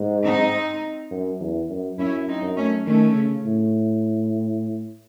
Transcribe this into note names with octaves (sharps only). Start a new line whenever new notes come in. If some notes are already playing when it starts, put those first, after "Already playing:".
Already playing: G#2
C4 D#4
F#2
E2
F#2
F#2 C#4 E4
C4 D#4
F#2
A3 C#4
D#3 A3 C#4
C#3
A2